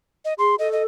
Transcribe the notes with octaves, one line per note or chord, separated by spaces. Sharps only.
D#5
G#4 C6
A4 D#5
D#5